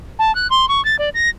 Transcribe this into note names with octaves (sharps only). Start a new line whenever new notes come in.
A5
F#6
C6
C#6
A6
D5
A#6